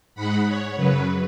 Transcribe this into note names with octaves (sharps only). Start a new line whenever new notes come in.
G#2 G#3 F#5 B5
C#5
F#2 C#3 F#3 B4